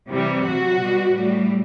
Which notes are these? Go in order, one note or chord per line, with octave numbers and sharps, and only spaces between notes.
C3 E3 G3
C3 F#3 F#4
B2 G3
A2 G3